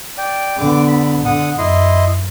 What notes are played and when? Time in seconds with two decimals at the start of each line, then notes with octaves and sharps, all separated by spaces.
0.18 D5 G5
0.58 D3 B3 D6
0.88 B5
1.25 D3 F#5 D#6
1.58 F#2 E4 D#5 C6